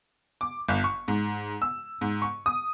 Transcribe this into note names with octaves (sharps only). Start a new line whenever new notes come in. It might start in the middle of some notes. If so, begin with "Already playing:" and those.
D6
G1
C#6
G#2
E6
G#2
C#6
D#6